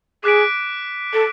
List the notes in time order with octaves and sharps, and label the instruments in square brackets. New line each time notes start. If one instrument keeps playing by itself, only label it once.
[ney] G#4 [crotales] D6 F#6 B6 D7
[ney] A4